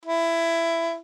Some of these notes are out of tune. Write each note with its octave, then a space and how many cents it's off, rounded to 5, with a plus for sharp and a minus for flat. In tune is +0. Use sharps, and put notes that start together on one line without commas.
E4 +15